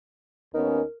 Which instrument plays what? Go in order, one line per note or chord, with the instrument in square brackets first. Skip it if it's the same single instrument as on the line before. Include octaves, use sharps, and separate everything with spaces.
[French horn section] D#2 B3 C#4 [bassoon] D#4 [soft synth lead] A#4